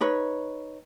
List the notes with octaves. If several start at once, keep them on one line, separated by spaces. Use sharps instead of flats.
D#4 B4 C#5